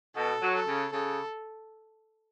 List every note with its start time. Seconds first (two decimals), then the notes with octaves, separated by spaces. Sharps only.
0.16 B2 A4
0.42 F#3
0.55 A4
0.67 C#3
0.93 C#3 A4